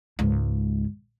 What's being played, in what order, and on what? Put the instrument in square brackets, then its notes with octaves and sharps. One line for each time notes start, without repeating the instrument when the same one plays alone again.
[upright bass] C#2 G#2